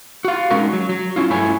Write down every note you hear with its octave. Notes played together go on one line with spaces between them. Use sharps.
F#4 F5
G#3 C#4 D#4 F#4 A#4
F#3
F#3
C#4 E4 F4
G2 A3 E4 C#5 G#5